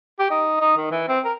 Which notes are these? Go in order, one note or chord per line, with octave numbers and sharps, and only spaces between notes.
G4
D#4
D#4
D#3
E3
C4
A#4